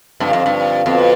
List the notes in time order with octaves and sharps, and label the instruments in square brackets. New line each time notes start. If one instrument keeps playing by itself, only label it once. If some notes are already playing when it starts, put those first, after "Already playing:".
[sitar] G2 [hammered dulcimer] D3 F3 C4 D#4
[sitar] F2
G2
[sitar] F2 [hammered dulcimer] B2 B3 F4